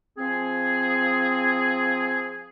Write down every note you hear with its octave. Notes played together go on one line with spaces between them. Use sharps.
F3 C4 G#4